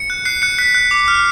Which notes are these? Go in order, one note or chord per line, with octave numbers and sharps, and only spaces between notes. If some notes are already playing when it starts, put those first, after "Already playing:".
Already playing: C#7
F#6
F#6 C7
F#6 C#7
F#6 B6
F#6
D6
F6